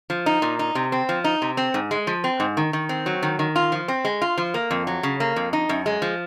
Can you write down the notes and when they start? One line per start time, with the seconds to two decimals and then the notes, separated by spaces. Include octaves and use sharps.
0.10 F3
0.26 D#4
0.42 A#2
0.59 D#4
0.75 C3
0.92 C4
1.09 F3
1.24 D#4
1.42 C3
1.57 C4
1.74 G#2
1.91 G#3
2.07 F3
2.24 C4
2.40 G#2
2.57 D#3
2.73 D#3
2.89 C4
3.06 F#3
3.23 D#3
3.39 D#3
3.56 F4
3.72 F3
3.88 C4
4.05 G#3
4.22 F4
4.38 F3
4.54 A#3
4.71 F2
4.87 F#3
5.03 C#3
5.20 A#3
5.36 F2
5.53 D#4
5.69 F#2
5.86 G#3
6.02 F3